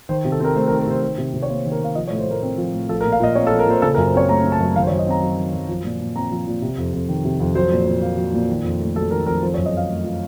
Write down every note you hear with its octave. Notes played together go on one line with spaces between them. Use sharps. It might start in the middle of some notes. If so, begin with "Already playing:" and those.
D#3 C5
C3
A4
C4 A#4
A3 C5
A#4
D#3
A#4
C3 C5
D#3 C5
C3
C3
C#5
A#3 C5
D#3
A#4
C3 F5
F3 D#5
C#5
A2
C5
A2 A#4
C4
F3
A2
F3 A4
A#4
A#2
F5
A#2 D#5
C4 C#5
A4
F3
A#4
A#2 C5
C#3 A4
A#4
F#2
C5
C4 C#5
A3 A#5
C#3
A5
F#2
D#3 F5
C5
C#5
F#2
D#5
C4 A#5
F#3
D#3
F#2
F3
A#2
A#2
C4 A#5
F3
A#2
C3
F2
F2
D#3
C3
F2
F#3 C5
A#2
A#2
A#3
F#3
A#2
D#3
F2
A3
F#3 A4
D#3 A#4
F2 A#4
F3 C5
C#5
F#2
D#5
C4 F5
A3
F3